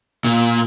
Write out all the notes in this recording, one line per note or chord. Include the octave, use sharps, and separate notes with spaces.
A#2